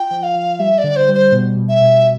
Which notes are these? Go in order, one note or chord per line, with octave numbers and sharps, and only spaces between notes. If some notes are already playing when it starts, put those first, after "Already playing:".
Already playing: F4 G5
F3
F5
F3
G3 E5
D5
D3
C5
G3
C5
B2
B2
E5
B2